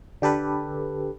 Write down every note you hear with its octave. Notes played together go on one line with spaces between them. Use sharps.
D3 G4 A4 B4